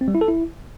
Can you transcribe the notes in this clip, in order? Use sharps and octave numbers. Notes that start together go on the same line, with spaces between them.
C4
G3
E4
A4
E4